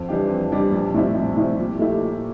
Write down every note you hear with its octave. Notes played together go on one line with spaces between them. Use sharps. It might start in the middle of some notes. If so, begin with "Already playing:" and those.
Already playing: F2
E3 G3 D4 G4
F2
E3 G3 D4 G4
A#1
A2 G3 C4 E4
A#1
A2 G3 C4 E4
A#2
A3 E4 G4
A#2